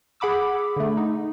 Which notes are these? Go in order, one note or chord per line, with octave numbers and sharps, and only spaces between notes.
G#4 F#5 B5 D6 E6
D3 A3
D#4